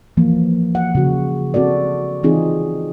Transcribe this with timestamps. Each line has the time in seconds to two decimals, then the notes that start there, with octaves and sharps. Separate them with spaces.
0.17 E3 F3 A#3
0.75 F#5
0.95 C#3 F#4
1.54 C4 F#4 A4 D5
2.23 E3 C4 D#4 F4 G#4